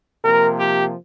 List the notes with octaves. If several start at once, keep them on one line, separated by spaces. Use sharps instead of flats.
C3 F3 A#3 A#4
G4